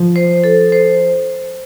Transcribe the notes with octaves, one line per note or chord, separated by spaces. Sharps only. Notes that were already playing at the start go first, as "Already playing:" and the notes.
Already playing: F3
C5
A4
C5